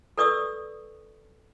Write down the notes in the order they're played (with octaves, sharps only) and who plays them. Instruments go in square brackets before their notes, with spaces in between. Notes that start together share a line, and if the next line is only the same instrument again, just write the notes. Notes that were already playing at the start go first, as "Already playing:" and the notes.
[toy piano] A4 B4 D5 C#6 D#6 E6